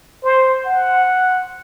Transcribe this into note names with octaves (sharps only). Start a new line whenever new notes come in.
C5
F#5